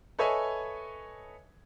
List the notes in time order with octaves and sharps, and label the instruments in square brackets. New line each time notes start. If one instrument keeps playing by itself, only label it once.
[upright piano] A4 B4 C#5 D#5 E5 G#5